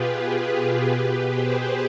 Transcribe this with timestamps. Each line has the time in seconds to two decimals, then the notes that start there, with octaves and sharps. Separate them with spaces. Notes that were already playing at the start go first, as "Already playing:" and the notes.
Already playing: B2 F4 G4 G#4 B4
0.12 F4 G#4
0.50 G4 B4
0.87 B2 G4 B4
1.25 G#4 C5